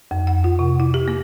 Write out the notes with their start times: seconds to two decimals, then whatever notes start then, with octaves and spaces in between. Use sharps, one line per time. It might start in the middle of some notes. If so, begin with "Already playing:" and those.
0.11 F2
0.27 F#5
0.44 F4
0.59 C3
0.80 E4
0.94 G4
1.08 A#3